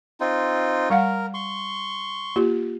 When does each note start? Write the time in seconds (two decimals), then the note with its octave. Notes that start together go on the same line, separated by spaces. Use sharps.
0.20 C4 D#4 F4
0.90 G3 A#4 F5 F#5
1.34 C6 C#6
2.36 A#3 F4 G4